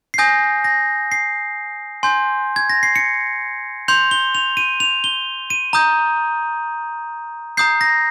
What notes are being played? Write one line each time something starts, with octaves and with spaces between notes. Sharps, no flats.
C7
G#5 D#6 G6 A#6
A#6
C7
G#5 C6 G6
G#6
A#6
C7
C#7
C6 G6 F7
G7
F7
D#7
F7
G7
D#7
A#5 D#6 G6
A#5 D#6 G6 C7
A#6